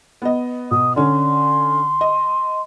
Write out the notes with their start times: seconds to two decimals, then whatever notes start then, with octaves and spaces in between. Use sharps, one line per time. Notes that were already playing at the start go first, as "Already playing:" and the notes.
0.22 B3 D#5
0.71 B2 D#6
0.96 D3 C#4 C6
2.01 D#5